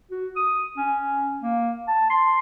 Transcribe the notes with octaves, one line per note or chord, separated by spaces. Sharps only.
F#4
D#6
C#4
A#3
A5
C6